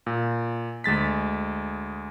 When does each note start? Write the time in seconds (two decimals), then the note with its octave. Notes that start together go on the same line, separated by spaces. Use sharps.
0.06 A#2
0.84 D2 G#3 A6 B6